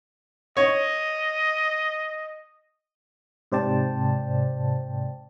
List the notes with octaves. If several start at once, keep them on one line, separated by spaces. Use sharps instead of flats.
C#5 D#5
G#2 C3 C5 D5 G5 A5